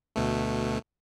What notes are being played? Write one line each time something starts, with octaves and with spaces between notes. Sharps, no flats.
D2 B2 A3